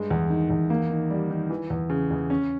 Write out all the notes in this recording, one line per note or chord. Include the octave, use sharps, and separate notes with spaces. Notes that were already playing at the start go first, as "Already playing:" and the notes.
Already playing: G2 G#3
E2
D#3
E2
A#3
D#3
G3
D#3
E3
E2
C#3
E2
C#4